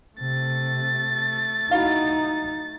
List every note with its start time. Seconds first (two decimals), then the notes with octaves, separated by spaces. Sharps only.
0.21 C3 A3 A6
1.71 D#4 E4 F#4 F5